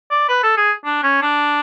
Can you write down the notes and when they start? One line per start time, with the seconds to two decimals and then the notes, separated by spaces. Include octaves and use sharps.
0.11 D5
0.29 B4
0.43 A4
0.57 G#4
0.85 D4
1.03 C#4
1.22 D4